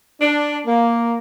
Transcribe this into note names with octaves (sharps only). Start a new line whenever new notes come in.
D4
A#3